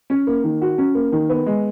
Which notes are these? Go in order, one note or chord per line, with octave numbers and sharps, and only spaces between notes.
C#4
A#3
D#3
F#4
C#4
A#3
D#3
B3
G#3